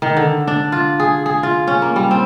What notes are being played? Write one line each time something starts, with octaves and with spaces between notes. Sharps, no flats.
D#3
D3
D4
F4
G#4
G#4
F4
C#4
A#3
G3
C4